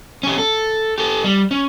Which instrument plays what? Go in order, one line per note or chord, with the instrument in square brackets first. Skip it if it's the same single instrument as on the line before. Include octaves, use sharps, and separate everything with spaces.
[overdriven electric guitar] C#4 G4
A4
G4 A4
G3
C#4